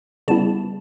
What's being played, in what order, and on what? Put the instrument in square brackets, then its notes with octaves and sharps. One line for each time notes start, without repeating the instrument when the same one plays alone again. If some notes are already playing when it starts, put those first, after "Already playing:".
[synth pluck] C#3 G3 B3 E4 A5